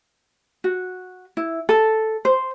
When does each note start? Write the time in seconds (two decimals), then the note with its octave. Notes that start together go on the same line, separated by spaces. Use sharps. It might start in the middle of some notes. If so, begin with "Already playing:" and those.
0.64 F#4
1.37 E4
1.69 A4
2.25 C5